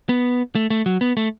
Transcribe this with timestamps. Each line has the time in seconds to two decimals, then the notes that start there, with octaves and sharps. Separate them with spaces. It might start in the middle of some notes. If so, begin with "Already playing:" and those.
0.09 B3
0.55 A3
0.70 A3
0.86 F#3
1.01 B3
1.17 A3